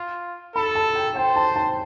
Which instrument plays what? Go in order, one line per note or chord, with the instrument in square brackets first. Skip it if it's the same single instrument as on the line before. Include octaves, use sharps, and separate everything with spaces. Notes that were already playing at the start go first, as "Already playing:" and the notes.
Already playing: [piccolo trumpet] F4
[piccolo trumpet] A4 [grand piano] B5
[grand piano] A5
G5
[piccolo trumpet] C5 [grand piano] G5
[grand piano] A5
A5